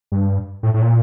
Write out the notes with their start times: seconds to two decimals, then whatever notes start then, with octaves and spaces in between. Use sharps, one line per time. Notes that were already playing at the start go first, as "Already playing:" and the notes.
0.12 G2
0.63 A2
0.74 A2
0.82 A#2